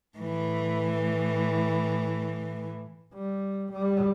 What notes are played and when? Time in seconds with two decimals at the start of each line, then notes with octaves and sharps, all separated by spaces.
0.18 A2 E3
3.14 G3
3.72 G3